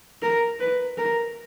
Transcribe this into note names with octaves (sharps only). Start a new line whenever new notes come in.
A#4
B4
A#4